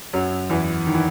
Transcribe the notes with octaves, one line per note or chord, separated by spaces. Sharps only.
F#2 F#3
E2 E3
D#3
E3